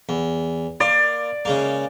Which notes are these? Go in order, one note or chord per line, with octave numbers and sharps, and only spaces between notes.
E2
A#3 D5 C6
C#3 G#3 A#3